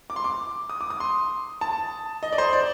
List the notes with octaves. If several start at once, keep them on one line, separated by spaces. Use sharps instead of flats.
D6
C6
D6
D#6
D6
D#6
C6
A5
D#5
D5
C5
D5